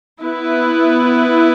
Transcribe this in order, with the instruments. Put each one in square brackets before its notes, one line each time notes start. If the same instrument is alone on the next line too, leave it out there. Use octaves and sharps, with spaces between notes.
[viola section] B3 E4 B4